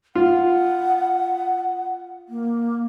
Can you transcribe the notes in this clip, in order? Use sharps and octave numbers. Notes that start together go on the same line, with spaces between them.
F4 F#5
A#3